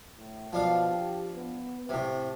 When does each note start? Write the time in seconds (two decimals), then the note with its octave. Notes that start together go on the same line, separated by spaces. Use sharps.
0.18 A2
0.53 B2 F3 D4 F5
0.90 G4
1.35 B3
1.89 A2 C3 C4